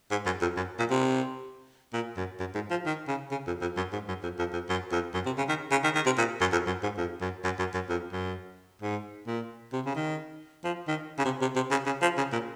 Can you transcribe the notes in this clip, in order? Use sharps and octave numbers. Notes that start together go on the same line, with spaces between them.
G#2
F#2
F2
F#2
A#2
C3
A#2
F#2
F#2
G#2
F3
D#3
C#3
C#3
F2
F2
F#2
G#2
F#2
F2
F2
F2
F#2
F2
F#2
C3
C#3
D#3
C#3
D#3
D#3
C3
A#2
F#2
F2
F#2
G#2
F2
F#2
F#2
F#2
F#2
F2
F#2
G#2
A#2
C3
C#3
D#3
F3
D#3
C#3
C3
C3
C3
C#3
C#3
F3
C#3
A#2